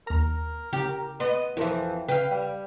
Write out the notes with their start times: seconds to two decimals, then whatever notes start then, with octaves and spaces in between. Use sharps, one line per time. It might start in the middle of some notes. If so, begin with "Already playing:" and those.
0.07 D#2 A#4 A#5
0.73 C#3 G4
1.20 B3 D#5 C6
1.57 F2 E3 F3 E4 A#4 C6
2.08 C#3 B4 F5 G5
2.30 G3